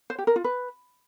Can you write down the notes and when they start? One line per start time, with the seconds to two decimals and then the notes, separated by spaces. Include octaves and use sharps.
0.10 C5
0.18 G4
0.27 A#4
0.36 F4
0.44 B4